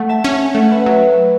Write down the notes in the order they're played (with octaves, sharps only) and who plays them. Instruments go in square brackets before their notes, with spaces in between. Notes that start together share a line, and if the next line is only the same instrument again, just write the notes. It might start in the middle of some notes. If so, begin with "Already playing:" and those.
Already playing: [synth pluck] A3 [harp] F#5
[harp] E5 A5
[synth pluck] C#4
[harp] C#5 F#5
[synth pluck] A3 [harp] E5
[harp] F#5
B4 E5
[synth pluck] F#3